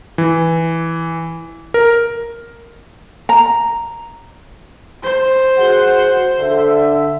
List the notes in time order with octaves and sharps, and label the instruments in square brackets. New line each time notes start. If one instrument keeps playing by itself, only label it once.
[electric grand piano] E3
A#4
[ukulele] A#5
[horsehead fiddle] C5
[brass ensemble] F#4 G#4 F#5
D3 E5